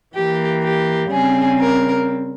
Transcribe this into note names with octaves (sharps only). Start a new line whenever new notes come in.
E3 A#3 G4
G4
C#3 G3 C4 G#4
A#4